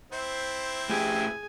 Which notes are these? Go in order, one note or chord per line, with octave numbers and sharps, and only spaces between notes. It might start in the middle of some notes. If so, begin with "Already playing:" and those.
C4 E4 C5 E5
A2 G4 G#4 G#5